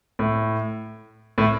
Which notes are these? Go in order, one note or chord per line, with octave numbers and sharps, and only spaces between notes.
A2
A2